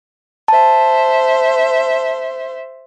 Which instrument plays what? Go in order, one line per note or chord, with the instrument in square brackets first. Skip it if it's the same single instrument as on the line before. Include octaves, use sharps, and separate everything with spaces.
[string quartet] C5 E5 [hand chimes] A5